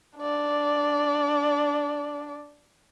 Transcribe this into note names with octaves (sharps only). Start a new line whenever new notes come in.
D4 D5